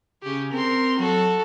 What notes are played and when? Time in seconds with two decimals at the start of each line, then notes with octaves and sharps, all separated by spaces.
0.23 C#3 C#4 G4
0.53 C4 A#4 C6
0.99 F#3 F#4 A4